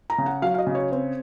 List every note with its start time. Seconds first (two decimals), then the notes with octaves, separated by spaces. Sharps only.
0.10 A#5
0.18 C#3
0.26 F#5
0.42 F#3 F5
0.54 F5
0.58 D#5
0.67 C#3
0.75 C#5
0.92 C4